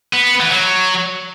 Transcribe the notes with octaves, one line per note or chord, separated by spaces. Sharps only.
B3
E3
F#3